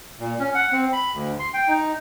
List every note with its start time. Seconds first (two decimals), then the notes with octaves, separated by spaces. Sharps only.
0.20 A#2
0.40 C#4
0.55 F#5
0.72 C4
0.93 B5
1.13 D2
1.39 C6
1.53 G5
1.68 D#4